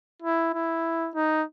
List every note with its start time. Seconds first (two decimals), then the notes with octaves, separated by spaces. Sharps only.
0.22 E4
0.54 E4
1.15 D#4